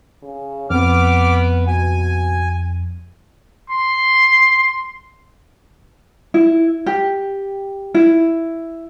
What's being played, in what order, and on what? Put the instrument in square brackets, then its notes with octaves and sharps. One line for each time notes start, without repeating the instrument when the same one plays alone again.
[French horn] C#3
[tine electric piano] F2 [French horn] B3 [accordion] D6 F6
[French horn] B2 [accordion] G#5
[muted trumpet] C6
[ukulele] E4
G4
E4